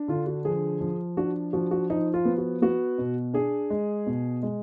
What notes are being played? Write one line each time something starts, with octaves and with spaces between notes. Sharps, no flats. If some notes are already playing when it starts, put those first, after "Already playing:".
Already playing: D4
D3 F4
F#4
F3 G#4
F3
D4 F#4
F3 F#4
F#4
F3 D#4
F4
B3
F#4
B3 F#4
B2
D4 G#4
G#3
B2
G#3